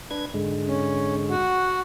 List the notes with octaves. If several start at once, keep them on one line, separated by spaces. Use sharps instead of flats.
D4 B4 G#6
G#2 D3 G#3
C#4
F#4 F#5